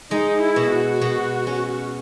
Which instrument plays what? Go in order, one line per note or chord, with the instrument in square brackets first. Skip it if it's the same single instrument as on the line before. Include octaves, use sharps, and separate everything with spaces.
[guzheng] G#3 [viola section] D#4
[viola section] E4
[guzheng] B2
[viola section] F#4
[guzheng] B2
C#4